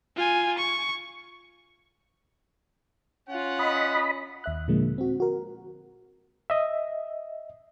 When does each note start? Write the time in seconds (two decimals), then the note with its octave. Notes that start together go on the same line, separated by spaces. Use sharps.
0.16 F4 G#5
0.58 C#6
3.29 C#4 F4 F#5
3.59 D#5 B5
4.44 D#2 E5 F#6
4.68 A#2 D3 F3 G#3 A#3
4.98 C4 F#4
5.20 F#4 A#4
6.50 D#5 E5